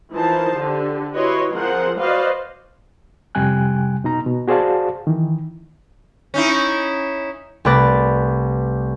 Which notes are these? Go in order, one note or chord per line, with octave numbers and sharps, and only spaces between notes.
E3 F3 D#4 A#4 C5 A5
D3 G4
E4 F#4 B4 C#5 D#5 C6
F3 C4 G#4 A#4 C5 F#5
F#4 B4 C5 D5 D#5 F5
F2 C3 G3 G5 G#5 F#6
B2 D#4 A#5
B2
F#4 G#4 C5 D5 F5 A5
D#3 E3
C#4 D#4 E4
C2 A3 B4 D6 A6 A#6